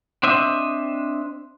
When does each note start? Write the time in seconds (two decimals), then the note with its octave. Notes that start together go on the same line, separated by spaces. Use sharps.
0.23 C4 D4 C5 D#5 E5